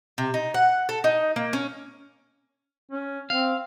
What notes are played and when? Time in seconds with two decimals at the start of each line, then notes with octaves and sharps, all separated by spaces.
0.18 C3
0.34 D#4
0.54 F#5
0.89 A4
1.04 D#4
1.36 A#3
1.53 C#4
2.91 C#4
3.30 C4 F5